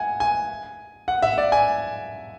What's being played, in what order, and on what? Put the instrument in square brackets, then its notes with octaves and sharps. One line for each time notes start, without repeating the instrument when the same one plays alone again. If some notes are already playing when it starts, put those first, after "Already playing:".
Already playing: [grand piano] E5 F#5 G#5
G#5
F#5
E5
D5
G#5